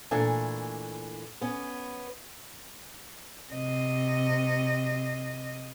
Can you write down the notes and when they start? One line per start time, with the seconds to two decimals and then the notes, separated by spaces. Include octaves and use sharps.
0.11 A#2 E3 A3 D4 G#5
1.41 B3 C#4
3.53 C3 D#5